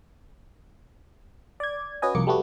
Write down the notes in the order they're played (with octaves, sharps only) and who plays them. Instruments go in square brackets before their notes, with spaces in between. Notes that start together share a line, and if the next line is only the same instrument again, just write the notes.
[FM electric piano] D5 G#6
C#4 F#4 B4 D#5 G#5
C2 F2 A#3 D6 C#7
G3 A3 B3 F#4